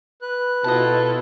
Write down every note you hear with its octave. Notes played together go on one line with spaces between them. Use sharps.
B4 F#6
B2 E4 F4 A4 D#5 A5